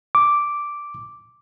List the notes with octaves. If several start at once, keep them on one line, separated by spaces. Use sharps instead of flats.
D6